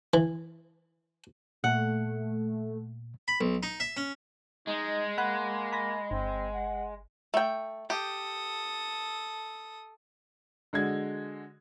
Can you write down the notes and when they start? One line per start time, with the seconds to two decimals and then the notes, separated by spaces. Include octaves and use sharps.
0.14 E3
1.64 A#2 A3 F#5
3.28 B5
3.41 B1
3.63 D#4
3.80 E5
3.97 C#4
4.67 G#3 D#4
5.18 A#3 F#5 B5 F#6
5.73 B5 A#6
6.11 G1 C4
6.54 F#5
7.34 A3 G5
7.90 G4 A4 D#6
10.73 D3 G#3 F#4 G#6